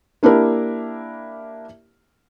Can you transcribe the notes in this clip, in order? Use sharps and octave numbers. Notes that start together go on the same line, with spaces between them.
A#3 D4 E4 G4 A#4